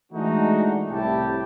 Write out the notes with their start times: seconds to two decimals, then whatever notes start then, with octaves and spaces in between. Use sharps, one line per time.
0.11 E3 G#3 A3 D4 D#4 F#4
0.90 C2 A2 C3 E4 G4 A5